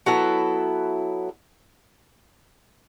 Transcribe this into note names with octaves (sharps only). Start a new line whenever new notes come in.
F#3 B3 E4 A4